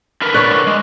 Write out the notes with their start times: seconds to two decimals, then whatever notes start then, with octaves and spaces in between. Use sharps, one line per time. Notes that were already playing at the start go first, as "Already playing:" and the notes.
0.22 D3 A#4 B4
0.35 C#5 D5 C#6 F#6
0.67 G#3